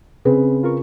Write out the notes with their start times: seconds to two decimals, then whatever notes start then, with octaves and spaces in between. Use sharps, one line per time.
0.25 C#3 C4 G#4 B4
0.63 F4 A#4 C#6